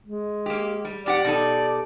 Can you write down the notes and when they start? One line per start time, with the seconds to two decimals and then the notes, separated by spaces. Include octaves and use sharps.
0.06 G#3
0.46 A#3 G4
0.85 G3
1.06 F2 G4 D5 F#5
1.25 B2 D#4 G4 A4